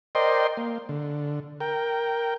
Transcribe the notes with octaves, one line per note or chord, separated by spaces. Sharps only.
A#4 C5 D5 D#5 G5 C6
A#3
D3
A#4 G5